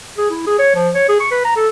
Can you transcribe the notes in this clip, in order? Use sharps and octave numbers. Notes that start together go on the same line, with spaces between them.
G#4
E4
G#4
C#5
F3
C#5
G#4
C#6
B4
A#5
A4